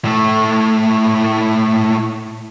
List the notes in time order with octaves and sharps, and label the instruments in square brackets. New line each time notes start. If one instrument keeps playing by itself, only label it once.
[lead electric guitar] A2 A3